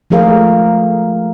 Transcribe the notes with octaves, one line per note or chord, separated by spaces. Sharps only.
F3 A3 G#4 A#4 F5